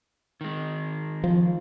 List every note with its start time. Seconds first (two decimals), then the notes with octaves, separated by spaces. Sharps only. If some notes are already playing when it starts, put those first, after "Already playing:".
0.41 D#3 G#3
1.24 F3